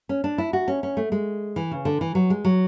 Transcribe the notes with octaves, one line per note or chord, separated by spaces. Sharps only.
C#4
D4
E4
F#4
C#4
C#4
A3
G#3
E3
C#3
D3
E3
F#3
G#3
F#3